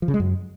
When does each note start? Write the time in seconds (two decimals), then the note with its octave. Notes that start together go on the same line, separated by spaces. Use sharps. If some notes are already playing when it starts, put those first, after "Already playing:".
0.02 F3
0.08 C#3
0.14 G#3
0.20 F#2